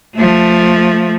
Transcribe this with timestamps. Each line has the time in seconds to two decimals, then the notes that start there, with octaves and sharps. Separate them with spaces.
0.15 F3 A3